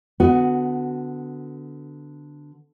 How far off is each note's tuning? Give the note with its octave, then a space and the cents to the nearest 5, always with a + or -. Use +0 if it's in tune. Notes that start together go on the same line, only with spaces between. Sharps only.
D3 +0 B3 +20 F#4 +0